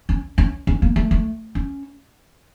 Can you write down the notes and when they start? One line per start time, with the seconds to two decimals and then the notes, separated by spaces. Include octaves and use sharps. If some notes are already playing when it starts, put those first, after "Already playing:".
0.09 C#4
0.38 C#4
0.67 C#4
0.82 A#3
0.96 A3
1.11 A3
1.55 C#4